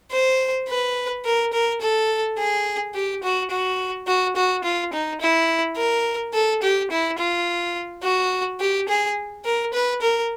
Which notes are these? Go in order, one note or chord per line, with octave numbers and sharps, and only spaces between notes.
C5
B4
A#4
A#4
A4
G#4
G4
F#4
F#4
F#4
F#4
F4
D#4
E4
A#4
A4
G4
E4
F4
F#4
G4
G#4
A#4
B4
A#4